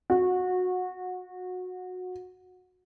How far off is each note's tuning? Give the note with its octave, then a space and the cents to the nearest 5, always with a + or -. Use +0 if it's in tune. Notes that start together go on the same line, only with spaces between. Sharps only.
F#4 -20